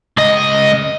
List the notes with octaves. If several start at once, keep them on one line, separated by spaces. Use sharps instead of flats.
C#2 D#5